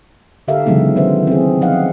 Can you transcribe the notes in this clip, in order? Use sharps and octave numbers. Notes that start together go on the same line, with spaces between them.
D3 G4 A4 A#4 E5 F5
C#3 E3 F#3 G#3 B3 D#4
D#3 C#4 E4 B4 C5 E5
C4 G#4
F3 D#4 D#5 F5 F#5